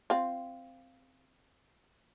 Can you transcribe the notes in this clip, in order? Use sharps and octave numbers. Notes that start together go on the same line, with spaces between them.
C4 F4